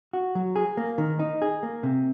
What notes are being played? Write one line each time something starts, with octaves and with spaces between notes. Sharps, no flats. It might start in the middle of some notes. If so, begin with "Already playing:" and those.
F#4
F#3
G#4
A#3
D#3
D#4
G#4
A#3
C3